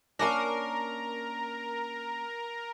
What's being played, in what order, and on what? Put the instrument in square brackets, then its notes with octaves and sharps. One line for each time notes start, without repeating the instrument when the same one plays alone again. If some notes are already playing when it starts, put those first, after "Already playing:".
[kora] A#3 C#4 D4 [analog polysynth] A#4